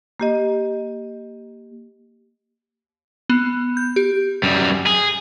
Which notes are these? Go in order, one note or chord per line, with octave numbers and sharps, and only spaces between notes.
A#3 G4 D#5
B3
G6
G4
F#2 G3
G#4